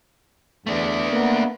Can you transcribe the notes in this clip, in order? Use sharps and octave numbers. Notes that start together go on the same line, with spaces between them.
E2 A3 D4
A#3 B3